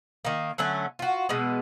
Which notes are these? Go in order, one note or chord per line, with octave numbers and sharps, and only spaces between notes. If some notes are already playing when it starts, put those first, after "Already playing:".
D#3 A#3
D3 F#3 A3 C#4
F4 F#4
B2 E3 G#3 B3